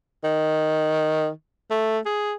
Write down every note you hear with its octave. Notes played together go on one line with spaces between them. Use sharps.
D#3
A3
G#4